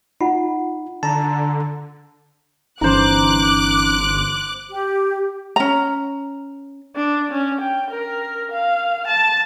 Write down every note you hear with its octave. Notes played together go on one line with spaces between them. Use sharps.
D#4 F4 F#5
D3 A5 A#5
G1 E3 C#4 D#4 C5 A#5 D6 F#6
G4
C#4 A#5
D4
C#4
G5
A#4
F5
A5